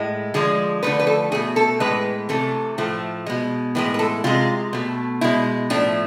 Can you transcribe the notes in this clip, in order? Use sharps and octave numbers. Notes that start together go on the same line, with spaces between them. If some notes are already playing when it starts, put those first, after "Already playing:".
Already playing: A2 G#3
D3 F3 G#3 G#4
D3 F3 A3 B4
B4
A4
B2 A3 G#4
A4
A2 E3 G#3 B4
C3 E3 A3 A4
A2 F3 A3
B2 G#3
A2 E3 G#3 B4
B4
A4
C3 G#3 F4
B2 A3
B2 G#3 E4
A2 F3 A3 D4